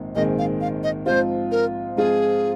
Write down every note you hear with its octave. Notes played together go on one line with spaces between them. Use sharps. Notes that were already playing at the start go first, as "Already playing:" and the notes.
Already playing: A#1 G#2 D#3 C4
A#1 G#2 D#3 C4 G#4 D#5
F5
F5
D#5
G#2 F3 C4 F4 C5
A#4
G#2 F3 C4 F4 G#4